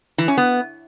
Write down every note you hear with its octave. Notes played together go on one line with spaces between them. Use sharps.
E3
C#4
B3